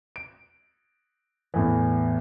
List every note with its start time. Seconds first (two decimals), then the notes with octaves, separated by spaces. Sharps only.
0.16 D7
1.54 E2 A2 E3